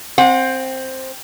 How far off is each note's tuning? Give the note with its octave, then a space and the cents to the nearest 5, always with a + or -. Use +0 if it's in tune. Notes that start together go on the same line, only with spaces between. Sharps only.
C4 +5 F#5 -30